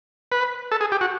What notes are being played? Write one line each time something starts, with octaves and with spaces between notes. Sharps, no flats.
B4
A4
G#4
G4
F#4